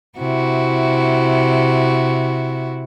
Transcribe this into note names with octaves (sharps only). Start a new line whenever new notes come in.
C3 E4 F#4